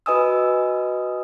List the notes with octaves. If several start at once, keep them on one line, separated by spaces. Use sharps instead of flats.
F#4 B4 D#5 G#5 D#6 E6